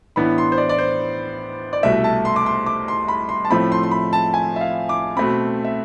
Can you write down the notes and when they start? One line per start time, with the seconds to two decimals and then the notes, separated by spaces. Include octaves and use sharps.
0.16 A2 E3 B3 D4 B5
0.38 C6
0.52 C5
0.58 D5
0.69 D5
0.78 C5
1.73 D5
1.83 C2 B2 A3 E5
2.04 A5
2.25 C6
2.36 D6
2.46 C6
2.66 D6
2.88 C6
3.08 B5
3.29 C6
3.45 A5
3.50 A2 F3 A3 C4 B5
3.72 C6
3.83 C6
3.91 B5
4.13 A5
4.34 G#5
4.56 E5
4.61 F5
4.89 D6
5.17 B2 A3 C4 B5
5.65 E5